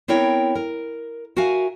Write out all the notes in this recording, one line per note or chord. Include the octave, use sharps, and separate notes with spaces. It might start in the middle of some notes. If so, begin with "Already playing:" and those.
B3 C4 E4 A#4 C#5 G5
A#4
F#4 A#4 E5 F5 G#5